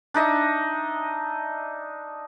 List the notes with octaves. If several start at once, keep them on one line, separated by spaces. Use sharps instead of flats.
D4 D#4 D#5 E5